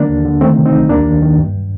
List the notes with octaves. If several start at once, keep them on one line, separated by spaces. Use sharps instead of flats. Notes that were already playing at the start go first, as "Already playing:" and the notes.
Already playing: D3 A#3 D4
D#2
D3
D#3 A3 C4
C3
C4 D#4
C2
D#2 A#3 D4
D#3
D#3
G2